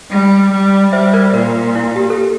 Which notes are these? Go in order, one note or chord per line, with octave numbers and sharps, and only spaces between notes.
G3
G3
G3 C5 E5
A#4 D5
A#2 A#4
E4
G4
A4
G4